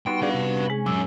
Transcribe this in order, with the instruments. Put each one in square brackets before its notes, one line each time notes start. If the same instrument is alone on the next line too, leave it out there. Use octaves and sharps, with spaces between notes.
[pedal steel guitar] G3 B3 F#4 [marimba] D#4 [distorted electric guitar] G5 [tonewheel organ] C6
[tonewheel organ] G#4 D5 G5 [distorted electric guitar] B4 F5
[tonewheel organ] C3
[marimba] G#3 G#4 [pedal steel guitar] C#4
[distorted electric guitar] F#2 [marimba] A#2 E6